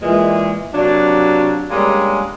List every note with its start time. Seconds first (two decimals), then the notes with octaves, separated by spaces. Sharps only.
0.02 A#2 E3 G#3
0.74 C3 F#3 A#3 D4
1.71 G3 G#3 A#3 C#4 D4 G#4